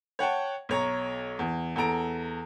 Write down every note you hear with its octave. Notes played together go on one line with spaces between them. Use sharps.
C#5 F#5 G5 A5
B1 C#5 A#5
E2
E2 A4 A#5 D7